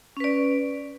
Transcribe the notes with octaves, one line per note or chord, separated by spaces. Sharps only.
C#4 B4 D5